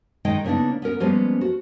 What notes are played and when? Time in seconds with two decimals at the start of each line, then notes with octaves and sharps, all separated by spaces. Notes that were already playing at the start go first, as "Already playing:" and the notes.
0.25 D#3 G#3 D#4 D#5 G5
0.44 C#3 A#3 B3 D4 D#4
0.82 B3 C#4 A#4
1.00 F3 G3 G#3 A#3 B3 C#4
1.41 F#4